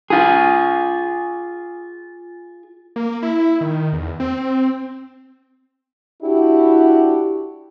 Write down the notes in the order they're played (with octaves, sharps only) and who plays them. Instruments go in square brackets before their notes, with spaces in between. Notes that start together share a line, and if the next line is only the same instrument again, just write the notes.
[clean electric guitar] F4 G#4
[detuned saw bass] A#3
E4
D#3
E2
C4
C4
[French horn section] D4 E4 F#4 G4